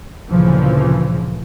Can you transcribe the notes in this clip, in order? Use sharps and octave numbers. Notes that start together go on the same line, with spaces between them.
D2 A#2 C#3 E3 F3